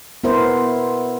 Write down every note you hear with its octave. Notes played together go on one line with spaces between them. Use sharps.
B3 E4 A#4 C5